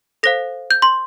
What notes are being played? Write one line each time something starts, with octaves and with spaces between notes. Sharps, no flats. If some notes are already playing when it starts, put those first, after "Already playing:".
A4 C5 F5 A#6
G6
C6